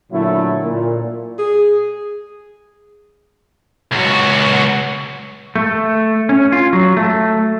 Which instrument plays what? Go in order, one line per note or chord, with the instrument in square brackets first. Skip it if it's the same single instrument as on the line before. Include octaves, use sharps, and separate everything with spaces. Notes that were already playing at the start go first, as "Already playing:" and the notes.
[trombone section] A#2 D3 F#3 A3 E4
A#2
[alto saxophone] G#4
[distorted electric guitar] C#2 F#4
[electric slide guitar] A3
C#4
F4
F#3
A3